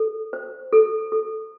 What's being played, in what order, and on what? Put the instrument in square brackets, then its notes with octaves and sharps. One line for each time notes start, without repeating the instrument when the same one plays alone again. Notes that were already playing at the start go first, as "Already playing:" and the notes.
Already playing: [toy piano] A4
C5
A4
A4